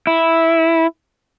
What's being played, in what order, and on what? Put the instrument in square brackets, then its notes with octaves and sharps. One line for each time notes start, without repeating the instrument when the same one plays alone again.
[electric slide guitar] E4